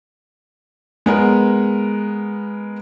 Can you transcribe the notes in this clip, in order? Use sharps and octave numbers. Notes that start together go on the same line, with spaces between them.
G#3 B3 A#4